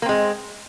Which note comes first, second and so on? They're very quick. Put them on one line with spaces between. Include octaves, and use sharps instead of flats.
A#3 C4 G#3